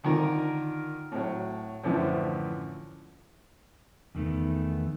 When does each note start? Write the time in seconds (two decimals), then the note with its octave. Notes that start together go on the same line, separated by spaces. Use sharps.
0.04 D3 D#3 F4 A#4
1.12 A2 F#3
1.84 F#2 A2 D3 E3 F3
4.15 E2 D#3 A3 B3